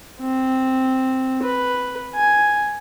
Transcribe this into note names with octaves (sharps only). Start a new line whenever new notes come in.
C4
B4
G#5